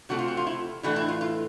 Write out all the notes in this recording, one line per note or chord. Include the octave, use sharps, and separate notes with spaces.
C3 F3 A3 C4 F#4
F4
F#4
F4
E4
A2 E3 A3 D4 F#4
E4
F4
F4